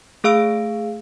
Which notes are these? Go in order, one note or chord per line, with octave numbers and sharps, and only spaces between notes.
A3 G#4 F5 E6 D7